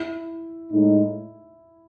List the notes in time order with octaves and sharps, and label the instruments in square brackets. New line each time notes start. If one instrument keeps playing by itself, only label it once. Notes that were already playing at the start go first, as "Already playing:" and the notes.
Already playing: [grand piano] E4
[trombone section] A2 G#3 D#4